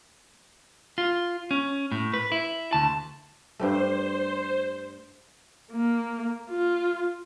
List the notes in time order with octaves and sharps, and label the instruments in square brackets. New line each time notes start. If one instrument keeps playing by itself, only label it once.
[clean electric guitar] F4
C#4
A2
B4
E4
D2 A5
[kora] G2 G3 A3 [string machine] C5
[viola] A#3
F4